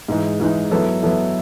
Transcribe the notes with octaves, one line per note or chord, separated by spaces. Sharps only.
G#2 E3 G#3 D#4
G#2 E3 G#3 D#4
F#3 B3 E4 A4
F#3 B3 E4 A4